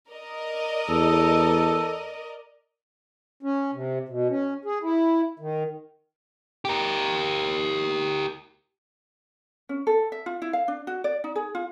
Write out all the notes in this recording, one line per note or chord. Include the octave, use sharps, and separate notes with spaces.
A#4 D5 D#5
E2 A4
C#4
C3
B2
C#4
G#4
E4
D#3
G4 A#4
C#4
A4
E5
F4
E4
F5
D4
F#4
D5
D#4
G#4
F4